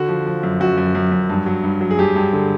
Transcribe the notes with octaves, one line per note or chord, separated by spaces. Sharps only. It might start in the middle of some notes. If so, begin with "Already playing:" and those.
Already playing: D3 F#4
F3
F3
F#2
F#2 F#4
F#2
F#2
F#2
G2
F#3
G2
F#3
G#4
G2 G4
G2
D3